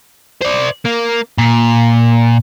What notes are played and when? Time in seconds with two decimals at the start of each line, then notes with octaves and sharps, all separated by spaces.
0.42 C5 D5
0.86 A#3
1.38 A#2